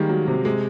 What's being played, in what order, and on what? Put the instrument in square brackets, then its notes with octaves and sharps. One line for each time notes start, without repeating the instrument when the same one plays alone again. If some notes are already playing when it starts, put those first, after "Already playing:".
Already playing: [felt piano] D#3 [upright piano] G3 G#3 A#3
[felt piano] F#3
C3
[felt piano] C3 [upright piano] G#3